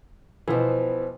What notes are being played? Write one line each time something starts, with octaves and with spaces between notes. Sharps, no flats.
B2 E3 F3 B3 C4